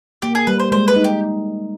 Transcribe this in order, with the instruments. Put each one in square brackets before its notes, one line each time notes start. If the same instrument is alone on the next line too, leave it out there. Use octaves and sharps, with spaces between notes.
[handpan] A#3 [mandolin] G4
[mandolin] G#4
[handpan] G3 [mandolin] B4
[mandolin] C5
[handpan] G#3 [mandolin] C5
[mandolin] B4
[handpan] D#4
[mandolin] G4